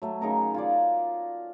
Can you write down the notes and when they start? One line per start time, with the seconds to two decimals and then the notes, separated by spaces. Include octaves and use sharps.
0.02 F#3 A3
0.21 C#3 D#4 A#4 A#5
0.54 F4 C#5 D5